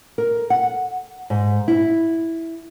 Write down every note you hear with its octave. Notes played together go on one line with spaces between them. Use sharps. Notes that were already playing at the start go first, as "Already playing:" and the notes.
A#4
F#5
G#2
E4